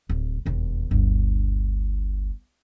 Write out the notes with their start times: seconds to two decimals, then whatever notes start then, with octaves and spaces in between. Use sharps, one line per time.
0.09 D1
0.46 E1 D#2
0.91 G1 D2